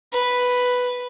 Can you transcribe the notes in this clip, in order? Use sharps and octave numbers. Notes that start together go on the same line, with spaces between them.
B4